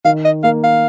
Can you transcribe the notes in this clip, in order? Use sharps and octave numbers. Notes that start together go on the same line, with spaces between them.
D#3 F5
D#5
A#3 F5
F5